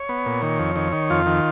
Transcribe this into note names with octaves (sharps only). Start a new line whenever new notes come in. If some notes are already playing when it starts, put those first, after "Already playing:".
Already playing: C#5
B3
A#2
D#3
F2
D#3
D#3
F2 F4
D#3